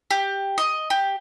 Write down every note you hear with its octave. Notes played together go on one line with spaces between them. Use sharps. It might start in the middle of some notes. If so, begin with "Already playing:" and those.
G4
D#5
G4